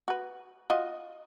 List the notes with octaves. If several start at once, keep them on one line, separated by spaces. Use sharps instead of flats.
F#4 B4
F4 F#4 D#5